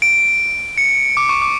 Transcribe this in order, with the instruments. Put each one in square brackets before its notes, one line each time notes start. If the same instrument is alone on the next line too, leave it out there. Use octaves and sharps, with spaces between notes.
[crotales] D7
C#7
D6
C#6
D6